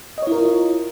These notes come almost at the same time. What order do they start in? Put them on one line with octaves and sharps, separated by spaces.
D#5 C#5 E4 A#4 F4